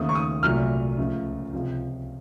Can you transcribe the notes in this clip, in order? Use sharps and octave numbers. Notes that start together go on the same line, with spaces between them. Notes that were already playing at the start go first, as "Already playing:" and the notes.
Already playing: D#2 C#3 A3 D#6
C#6
D#6
C2 A#2 F#3 A3 F6
C#2 C#3 F3 A3
C#2 C3 F3